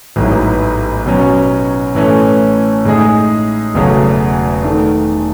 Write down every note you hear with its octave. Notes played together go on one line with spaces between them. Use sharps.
A1 G#2 F#3 B3 E4
B2 F#3 C#4
A2 E3 A3 C#4
A2 G#3 D#4 G#4
E1 E2 C#3 F#3 A3
D#3 A3